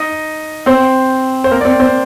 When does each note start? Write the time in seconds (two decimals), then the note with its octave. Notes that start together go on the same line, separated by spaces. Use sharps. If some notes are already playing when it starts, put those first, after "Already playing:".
Already playing: D#4 D#5
0.66 C4 C5
1.44 C5
1.51 A#3 A#4
1.61 D5
1.65 C4 C5
1.80 C4 C5